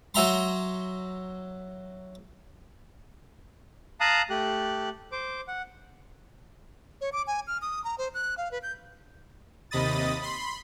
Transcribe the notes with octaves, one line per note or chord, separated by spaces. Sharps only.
F#3 F#4 E5 A#5 C6
F5 A5 A#5 D#6 F#6
A3 G4 F#6
C5 D6
F#5
C#5
D6
G#5
F6
D#6
A#5
C5
F#6
F5
B4
G6
D#2 C3 D#5 B5 D#6 A6
B5 C6